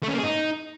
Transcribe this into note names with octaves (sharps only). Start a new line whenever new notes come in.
A3
C#4
A#3
G#4
D#4